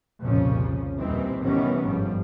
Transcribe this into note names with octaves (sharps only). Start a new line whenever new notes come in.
C2 F2 A#2 C#3 F3 C#4
D#2 A#2 D#3 E3 G3 C4
C3 D#3 E3 G3 B3 C#4
G1 G#2 F3 G3